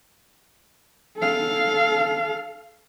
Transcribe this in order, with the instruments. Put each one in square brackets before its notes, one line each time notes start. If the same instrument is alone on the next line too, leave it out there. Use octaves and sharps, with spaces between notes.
[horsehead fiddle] A4 F5